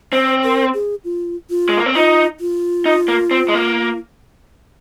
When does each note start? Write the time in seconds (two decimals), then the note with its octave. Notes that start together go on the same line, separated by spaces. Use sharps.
0.13 C4 C5
0.44 A#4
0.74 G#4
1.04 F4
1.50 F4
1.69 G#3
1.77 A#3
1.86 C4
1.95 D#4 F4
2.40 F4
2.85 D#4
3.08 A#3
3.31 C4
3.48 G#3
3.54 A#3